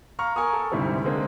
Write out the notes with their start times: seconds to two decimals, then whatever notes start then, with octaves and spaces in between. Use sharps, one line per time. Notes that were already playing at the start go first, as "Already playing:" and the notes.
0.19 F5 A#5 C#6 F6
0.36 A#4 G#5 C#6 D#6
0.53 A4
0.72 D2 G#2 C3 E3 G3 C4
1.04 D3 G#3 A#3 C4